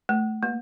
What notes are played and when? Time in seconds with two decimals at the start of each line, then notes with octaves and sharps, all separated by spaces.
0.09 A3
0.43 A#3